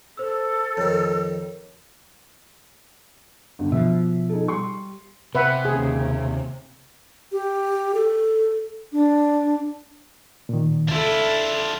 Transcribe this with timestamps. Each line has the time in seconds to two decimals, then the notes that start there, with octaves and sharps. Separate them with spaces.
0.17 A4 C5 E6
0.77 F2 D#3 C#5
3.59 G1 D3
3.72 B2 F3 E5
4.29 D#4 G#4 A4
4.48 G3 C6 C#6
5.35 C3 B4 E5 F#5
5.65 D#2 C#3 G#4
7.32 G4
7.95 A4
8.93 D4
10.49 A#2 D#3
10.88 C#2 D4 E4 F4 A4